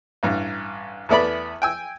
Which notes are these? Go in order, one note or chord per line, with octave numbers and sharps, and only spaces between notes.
A1 G2
E2 A3 B3 D5 B5
G5 G#5 E6